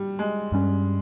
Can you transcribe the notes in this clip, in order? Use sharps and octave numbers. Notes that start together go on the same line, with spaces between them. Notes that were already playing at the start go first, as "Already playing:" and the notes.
Already playing: G3
G#3
G2 G3 C#4